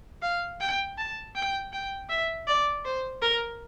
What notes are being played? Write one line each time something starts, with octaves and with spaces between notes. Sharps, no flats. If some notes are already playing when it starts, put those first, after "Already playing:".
F5
G5
A5
G5
G5
E5
D5
C5
A#4